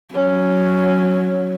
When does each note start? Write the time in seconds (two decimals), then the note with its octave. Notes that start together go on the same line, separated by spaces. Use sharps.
0.15 F#3 C#4